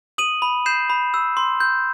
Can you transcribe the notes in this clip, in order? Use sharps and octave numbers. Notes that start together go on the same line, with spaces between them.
D#6 D#7 F#7
B5
G6 C7 E7
B5
E6
C6
G6